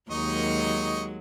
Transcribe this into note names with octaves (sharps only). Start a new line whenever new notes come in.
D#2 F#3 G#3 D#4 D#5 C#6